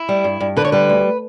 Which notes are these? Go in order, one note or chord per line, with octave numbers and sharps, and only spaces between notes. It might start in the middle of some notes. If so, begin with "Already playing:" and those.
Already playing: E4
G3
G2
G2
D3 B4
C#5
G3 B4
D2